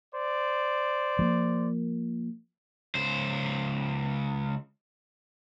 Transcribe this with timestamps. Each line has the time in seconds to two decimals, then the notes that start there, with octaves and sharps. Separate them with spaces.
0.14 C5 D5
1.19 F3 A#3
2.95 C#2 C5